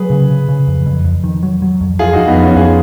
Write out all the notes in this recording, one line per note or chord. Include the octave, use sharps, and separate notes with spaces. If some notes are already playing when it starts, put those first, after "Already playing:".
Already playing: F#3 G#4 B4
C#3
C#3
C#3
F2
F2
F2
D#3
F#3
F#3
F2
F2 F4 G#4
F2 D#4 F#4
B3 D#4
F3
C#4 F4
F2 F4 G#4